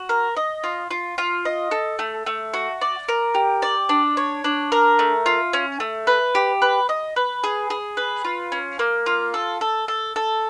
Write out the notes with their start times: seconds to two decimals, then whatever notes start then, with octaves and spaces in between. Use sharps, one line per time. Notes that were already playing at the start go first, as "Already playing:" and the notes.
Already playing: F#4
0.09 A#4
0.37 D#5
0.64 F4
0.90 F4
1.18 F4
1.45 D#5
1.71 A4
1.99 A3
2.26 A3
2.54 F#4
2.81 D5
3.08 A#4
3.35 G4
3.62 D5
3.89 D4
4.17 C#5
4.44 D4
4.72 A#4
4.99 A3
5.26 F4
5.53 C#4
5.80 A3
6.07 B4
6.35 G4
6.62 B4
6.89 D#5
7.16 B4
7.44 G#4
7.70 G#4
7.97 B4
8.24 F4
8.52 C#4
8.79 A#3
9.06 F4
9.34 A4
9.61 A4
9.88 A4
10.16 A4